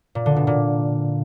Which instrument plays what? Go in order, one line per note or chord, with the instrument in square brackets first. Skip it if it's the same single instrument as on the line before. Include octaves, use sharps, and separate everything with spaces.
[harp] A#2
D3
B2
A#2